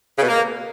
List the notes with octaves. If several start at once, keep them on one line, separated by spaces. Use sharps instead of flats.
C#3
B2
A#3